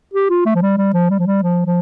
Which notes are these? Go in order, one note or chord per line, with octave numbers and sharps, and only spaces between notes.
G4
F4
A3
F3
G3
G3
F3
G3
F3
G3
F3
F3